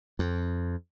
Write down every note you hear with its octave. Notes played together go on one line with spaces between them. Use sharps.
F2